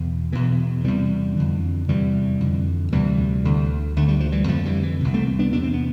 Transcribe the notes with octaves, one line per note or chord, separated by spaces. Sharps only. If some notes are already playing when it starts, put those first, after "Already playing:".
Already playing: E2 B2
E2 B2 E3
E2 C3 E3 G3
F2 D3
E2 C3 E3 G3
F2 D3
D2 C3 E3 G3
D2 D3
D2 D3 A3
G3
F3
E3 G3
F2 D3 F3 A3
E3 G3
E3
C2 C3
A3 C4
B3 D4
E2 C3 D4
C4
B3